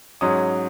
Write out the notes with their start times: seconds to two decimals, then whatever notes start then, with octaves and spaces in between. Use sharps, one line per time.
0.21 G#2 F#3 C#4 D#6